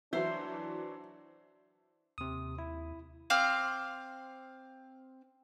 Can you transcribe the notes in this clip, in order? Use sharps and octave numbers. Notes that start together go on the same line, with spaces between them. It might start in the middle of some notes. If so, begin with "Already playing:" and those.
E3 F#3 D4 C5 E5
D#2 C3 D#6
E4
C4 F5 C6 D6